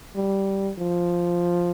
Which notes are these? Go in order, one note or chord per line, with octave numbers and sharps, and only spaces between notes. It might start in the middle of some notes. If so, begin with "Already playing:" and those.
G3
F3